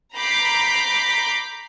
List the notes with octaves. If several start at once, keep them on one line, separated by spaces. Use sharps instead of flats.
A#5 B5 D6 G6 B6 C7